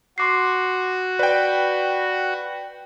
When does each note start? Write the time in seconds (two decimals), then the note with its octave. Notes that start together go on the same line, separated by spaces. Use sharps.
0.18 F#4 C6 D6 C7
1.19 B4 D5 G5